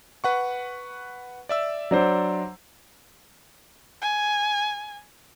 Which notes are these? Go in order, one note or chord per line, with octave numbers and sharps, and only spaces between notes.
B4 F#5 C#6
D5 E5 E6
F#3 D4 C5
G#5